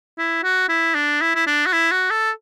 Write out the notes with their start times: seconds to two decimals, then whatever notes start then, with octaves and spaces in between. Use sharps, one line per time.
0.18 E4
0.44 F#4
0.69 E4
0.95 D4
1.21 E4
1.35 E4
1.47 D4
1.66 F#4
1.73 E4
1.91 F#4
2.10 A4